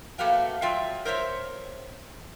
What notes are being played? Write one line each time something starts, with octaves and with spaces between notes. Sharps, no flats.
A3 A#3 F#4 B4 F5 G5
F#3 F4 E5 G5
A#4 C5 C#5 E5